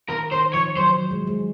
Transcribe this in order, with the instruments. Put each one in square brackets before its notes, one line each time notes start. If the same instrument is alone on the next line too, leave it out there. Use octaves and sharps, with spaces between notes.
[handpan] D#3 [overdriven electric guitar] A#4
[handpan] D#3 [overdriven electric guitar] C5
[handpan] F3 [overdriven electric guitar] C#5
[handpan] F#3 [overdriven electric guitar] C5
[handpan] F#3
G#3
G#3